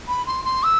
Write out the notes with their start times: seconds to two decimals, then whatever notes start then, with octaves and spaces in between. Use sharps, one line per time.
0.08 B5
0.27 C6
0.45 C6
0.63 E6